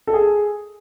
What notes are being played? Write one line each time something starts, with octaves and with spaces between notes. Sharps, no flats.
A4
G#4